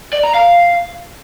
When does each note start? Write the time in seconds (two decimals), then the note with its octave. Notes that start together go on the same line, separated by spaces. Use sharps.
0.12 D5
0.23 A#5
0.34 F5